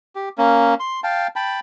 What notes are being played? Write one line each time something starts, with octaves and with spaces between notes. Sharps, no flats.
G4
A#3 C#4
C6
F5 G5 A5
G5 A5 B5